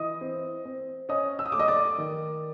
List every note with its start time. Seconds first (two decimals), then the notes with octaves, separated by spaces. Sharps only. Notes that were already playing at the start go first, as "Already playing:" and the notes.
Already playing: E3 D#5 D#6
0.21 C4
0.65 C4
1.09 C#4 D#5 D#6
1.39 E6
1.46 D#6
1.52 A3 D6
1.59 D#5 D#6
1.68 D5 D6
1.98 D#3